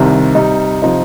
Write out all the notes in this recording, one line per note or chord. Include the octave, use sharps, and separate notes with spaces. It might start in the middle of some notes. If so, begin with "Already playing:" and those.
Already playing: C2 C3 D#3
C3 G3 D#4
C3 F3 D#4